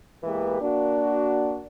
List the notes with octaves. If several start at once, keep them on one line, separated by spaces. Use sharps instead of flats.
E2 E3 G#3 A#3 G4 B4
A#3 D4 F#4